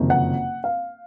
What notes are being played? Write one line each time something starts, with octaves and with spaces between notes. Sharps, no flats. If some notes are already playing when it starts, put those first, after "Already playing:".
Already playing: F#1 F2 C3 D#3
F#5
F5